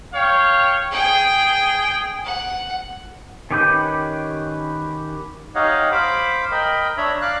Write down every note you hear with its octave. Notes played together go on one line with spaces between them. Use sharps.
C#5 F5 G5
G#4 G5
F#5
D#3 C#4 G4 B4 G6
D#4 G4 C#5 D#5 F5 F#5
C5 F5 B5 D6
A#4 D#5 G5 B5
D4 C#5 E5 A#5 B5
D5 F5 F#6